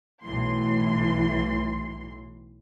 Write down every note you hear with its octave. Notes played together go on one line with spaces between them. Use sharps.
B1 A2 E3 C6